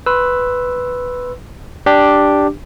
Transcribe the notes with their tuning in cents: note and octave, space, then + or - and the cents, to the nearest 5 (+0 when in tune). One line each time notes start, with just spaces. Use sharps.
B4 +5 C6 +20 E6 +0
D4 +0 G4 +0